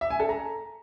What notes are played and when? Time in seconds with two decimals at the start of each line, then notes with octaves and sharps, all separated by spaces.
0.01 E5
0.10 G#5
0.20 A4
0.29 A#5